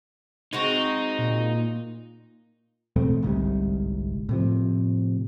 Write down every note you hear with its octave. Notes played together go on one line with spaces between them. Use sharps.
G#3 C4 D#4 F#4
A#2
E2 B2 A3 C4
G1 C2 G#2 C3
A2 C3 F3